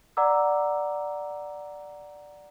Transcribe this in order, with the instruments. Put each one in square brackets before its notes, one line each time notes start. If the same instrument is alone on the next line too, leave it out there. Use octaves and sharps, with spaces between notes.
[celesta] D5 F#5 A#5 D6 E6